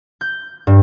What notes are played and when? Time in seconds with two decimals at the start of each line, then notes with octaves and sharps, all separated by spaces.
0.21 G6
0.67 G2